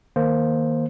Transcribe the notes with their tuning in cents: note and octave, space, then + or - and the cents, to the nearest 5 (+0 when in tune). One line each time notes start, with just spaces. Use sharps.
D#3 +0 A#3 +0 C5 +0